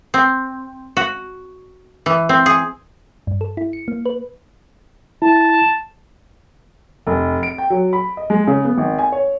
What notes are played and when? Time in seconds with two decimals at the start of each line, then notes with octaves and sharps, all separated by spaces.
0.14 C4
0.97 F#4
2.06 E3
2.29 C4
2.46 G#4
3.27 G2
3.41 A4
3.57 E4
3.73 C#7
3.88 A#3
4.06 B4
5.22 E4 A5
7.07 F1
7.43 D7
7.58 G5
7.70 F#3
7.93 B5
8.17 D#5
8.30 G#3
8.47 C#3
8.65 B3
8.78 G#1
8.98 G#5
9.12 C#5